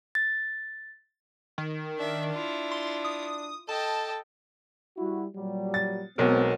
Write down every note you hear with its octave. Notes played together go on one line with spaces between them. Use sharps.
A6
D#3
D4 E5
E4 F4
C6
D#6
A4 D#5 G5 A5
G3 E4 F#4
A#2 F#3 G3
A6
B1 F#3 G#3 B3 C4 A#4